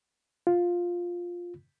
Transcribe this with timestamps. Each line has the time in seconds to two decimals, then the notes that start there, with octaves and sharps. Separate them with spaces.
0.47 F4